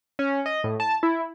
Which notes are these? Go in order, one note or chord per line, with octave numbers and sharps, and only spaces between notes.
C#4
D#5
A2
A5
E4